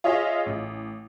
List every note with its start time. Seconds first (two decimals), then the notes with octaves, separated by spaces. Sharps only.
0.04 F4 G#4 C#5 D#5 E5
0.46 A1